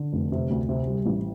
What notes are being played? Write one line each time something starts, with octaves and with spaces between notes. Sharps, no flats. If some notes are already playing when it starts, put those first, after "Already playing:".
Already playing: D3
F1
C3
D2
C3
G3
A1